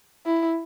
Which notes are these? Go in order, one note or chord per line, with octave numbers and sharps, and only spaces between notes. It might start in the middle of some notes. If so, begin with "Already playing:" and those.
E4